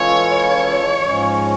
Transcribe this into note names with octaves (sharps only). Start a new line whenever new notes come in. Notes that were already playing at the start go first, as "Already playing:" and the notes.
Already playing: E3 G#3 C#4 F4 A4 C#5
G#2 F3 G#3 C#4